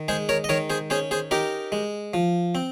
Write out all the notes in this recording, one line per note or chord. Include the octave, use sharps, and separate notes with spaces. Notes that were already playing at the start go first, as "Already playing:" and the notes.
Already playing: D#3
G#3 G#4 C5
A#4 C#5
D#5
D#3 A#4 C#5
G#4 C5
C#4 G#4 C5
G#4 C5
D#4 G4 A#4
G#3
F3
C4